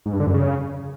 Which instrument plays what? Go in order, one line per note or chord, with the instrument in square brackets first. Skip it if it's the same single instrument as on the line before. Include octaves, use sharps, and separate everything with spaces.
[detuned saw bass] G#2
G2
D3
F#2
C#3